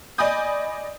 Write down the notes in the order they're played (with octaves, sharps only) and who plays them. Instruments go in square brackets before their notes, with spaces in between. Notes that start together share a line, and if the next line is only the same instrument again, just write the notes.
[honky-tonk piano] D5 D#5 G#5 B5 D#6 G6